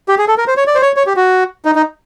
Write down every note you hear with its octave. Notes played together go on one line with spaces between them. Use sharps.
G4
G#4
A4
A#4
C5
C#5
D5
C5
C#5
C#5
G4
F#4
D#4
D#4